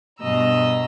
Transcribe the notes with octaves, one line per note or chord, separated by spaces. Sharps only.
G2 B2 D#5 A#5 E6